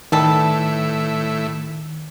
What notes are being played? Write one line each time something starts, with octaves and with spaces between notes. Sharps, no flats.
A2 D#3 E3 G3 E4 A4